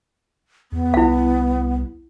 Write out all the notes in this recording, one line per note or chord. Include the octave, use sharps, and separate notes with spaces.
E2 B3
C2 E4 F5